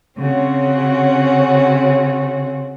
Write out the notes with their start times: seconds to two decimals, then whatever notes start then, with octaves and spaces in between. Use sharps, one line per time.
0.18 C#3 C4 C#4 F#4